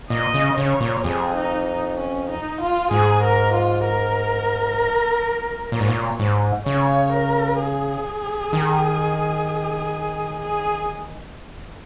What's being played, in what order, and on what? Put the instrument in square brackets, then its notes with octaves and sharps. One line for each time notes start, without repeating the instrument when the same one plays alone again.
[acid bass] A#2 [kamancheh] D#5
[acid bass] C#3
[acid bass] C#3 [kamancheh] C#5
[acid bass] A#2
[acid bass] F2 [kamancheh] G#4
[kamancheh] D#4
D#4
C#4
D#4
F4
[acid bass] G#2 [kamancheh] G#4
[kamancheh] A#4
F4
A#4
[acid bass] A#2 [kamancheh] C#5
[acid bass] G#2
A#2
G#2
[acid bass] C#3 [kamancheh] C#5
[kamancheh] A#4
G#4
[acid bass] D#3
[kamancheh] G#4